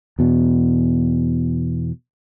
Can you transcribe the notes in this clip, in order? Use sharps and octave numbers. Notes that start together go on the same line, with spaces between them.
E2 B2